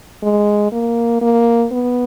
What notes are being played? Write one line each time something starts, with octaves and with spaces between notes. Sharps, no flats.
G#3
A#3
A#3
B3